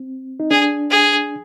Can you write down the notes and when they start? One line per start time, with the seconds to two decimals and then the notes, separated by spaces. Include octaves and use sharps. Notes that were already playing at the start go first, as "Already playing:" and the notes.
Already playing: C4
0.40 D#4
0.50 D4 G#4
0.90 G#4